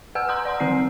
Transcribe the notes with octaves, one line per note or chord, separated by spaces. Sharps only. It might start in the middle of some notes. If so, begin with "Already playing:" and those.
B4 F#5 G#5 E6 F6
A#5 C6 D#6 E6 G6
D5 F#5 C6
D3 D#3 C4 C7